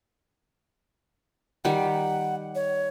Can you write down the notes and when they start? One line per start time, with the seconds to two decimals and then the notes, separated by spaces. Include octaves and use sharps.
1.65 D#3 G3 F#5
2.55 C#5